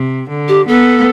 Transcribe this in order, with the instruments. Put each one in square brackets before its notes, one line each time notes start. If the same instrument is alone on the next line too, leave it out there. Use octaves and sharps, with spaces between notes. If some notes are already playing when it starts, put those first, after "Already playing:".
Already playing: [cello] C3
D3
[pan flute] G4
[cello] B3 [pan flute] A4